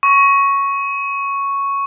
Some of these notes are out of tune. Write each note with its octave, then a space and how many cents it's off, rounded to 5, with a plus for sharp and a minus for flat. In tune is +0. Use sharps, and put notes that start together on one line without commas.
C#6 +0